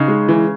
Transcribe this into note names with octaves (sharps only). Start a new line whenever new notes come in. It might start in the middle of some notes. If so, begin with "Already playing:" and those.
Already playing: C#3 D#4
G#3
E3